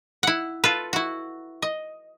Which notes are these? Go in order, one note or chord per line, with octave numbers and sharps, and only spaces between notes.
E4 F#5
F4 A4 B4
E4 F#4
D#5